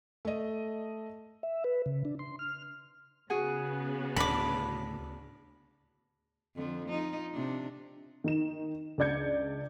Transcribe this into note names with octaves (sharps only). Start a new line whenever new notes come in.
A3 D#5
E5
B4
C#3
D4
C6
F6
C#3 B3 F#4 G#4 F#5
D2 A2 D4 B5 D6
F2 D3 F3
D#4 F4
C3 D4
D#3 D#4 E7
C#2 D4 D5 G6 G#6 C#7